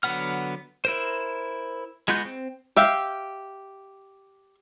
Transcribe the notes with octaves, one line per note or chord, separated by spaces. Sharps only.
D3 F#3 B3 F#5 F6
E4 A#4 C5
G#3 B3 F4 F#4 G6
C4
G4 E5 F5 G5